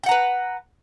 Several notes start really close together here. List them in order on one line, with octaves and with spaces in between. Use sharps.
G5 F#5 A#5 B4